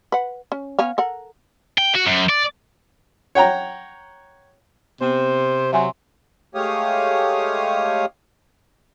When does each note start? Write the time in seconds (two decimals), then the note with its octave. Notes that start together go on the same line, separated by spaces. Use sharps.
0.12 B4 F#5
0.52 C#4
0.79 B3 C#4 F5
0.98 A4 A#4 F#5
1.78 G5
1.95 F#4
2.07 F#2
2.30 D5
3.35 C#5 F#5 G5 A#5
5.01 C3 B3 C5
5.73 F#3 E5 G#5 C6
6.55 G#3 A3 G4 C#5 F5 D#6